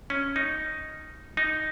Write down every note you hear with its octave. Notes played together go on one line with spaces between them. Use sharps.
C#4
D#4
D#4